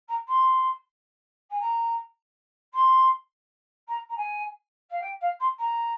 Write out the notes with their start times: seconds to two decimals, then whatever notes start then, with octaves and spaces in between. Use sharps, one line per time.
0.08 A#5
0.28 C6
1.50 G#5
1.60 A#5
2.73 C6
3.88 A#5
4.09 A#5
4.17 G#5
4.90 F5
5.01 G5
5.21 F5
5.40 C6
5.58 A#5